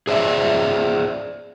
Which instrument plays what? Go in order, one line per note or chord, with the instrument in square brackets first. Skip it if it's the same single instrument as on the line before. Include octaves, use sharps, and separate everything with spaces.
[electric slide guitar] G#4 C5 D5 E5